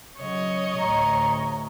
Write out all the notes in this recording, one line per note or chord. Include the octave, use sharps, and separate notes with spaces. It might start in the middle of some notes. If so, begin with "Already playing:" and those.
C#3 F#3 C#5 D#5
A1 D2 A#5